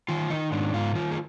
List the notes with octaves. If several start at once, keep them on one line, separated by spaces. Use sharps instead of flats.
D#3 F4
D#3 D#4
G#2 D4
G#2 F4
D#3 F4
G#4